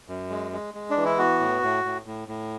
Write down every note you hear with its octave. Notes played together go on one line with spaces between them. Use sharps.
F#2
G#3
G#3
G#3
D4
E3
E4
B3 F#4
A2
A2
A2
A2
A2